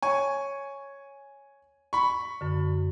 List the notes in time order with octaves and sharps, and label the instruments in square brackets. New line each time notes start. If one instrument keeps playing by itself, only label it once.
[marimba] C#5 [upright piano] G#5 C#6
[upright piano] B5 C#6
[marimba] F#2 D3